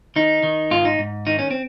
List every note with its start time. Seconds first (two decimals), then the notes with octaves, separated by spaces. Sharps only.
0.16 D#3 D#4
0.43 D#3
0.71 G#2 F4
0.85 D#4
0.99 G#2
1.27 D#3 D#4
1.39 C#4
1.51 C4